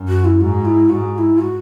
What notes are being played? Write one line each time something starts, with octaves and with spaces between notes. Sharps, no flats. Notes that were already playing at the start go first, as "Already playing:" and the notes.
Already playing: F#2
F#4
E4
G#2 F#4
E4
G#2 F#4
F#4
E4
F#4